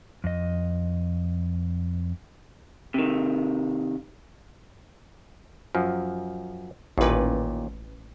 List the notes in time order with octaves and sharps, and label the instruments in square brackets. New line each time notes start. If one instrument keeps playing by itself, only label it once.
[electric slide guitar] F2 D#5
[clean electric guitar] C3 D#3
[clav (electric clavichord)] F#2 F3
[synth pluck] A1 B4 [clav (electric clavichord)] D#2 A#2